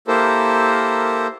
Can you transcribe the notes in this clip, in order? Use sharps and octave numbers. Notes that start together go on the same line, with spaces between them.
A#3 E4 G4 A4 A#4 C5